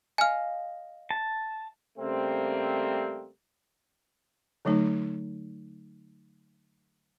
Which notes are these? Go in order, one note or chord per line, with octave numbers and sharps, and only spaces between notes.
D#5 F5 G#5 F6
A5
C#3 G3 A3 A#3 C4
D3 F#3 A3 D#4